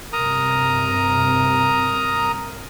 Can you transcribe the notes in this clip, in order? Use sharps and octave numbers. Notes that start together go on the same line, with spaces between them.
G2 C3 A#4 A#5 D#6